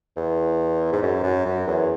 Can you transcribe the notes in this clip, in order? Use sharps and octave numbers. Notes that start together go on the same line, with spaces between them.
E2
G#2
F#2
F#2
F#2
E2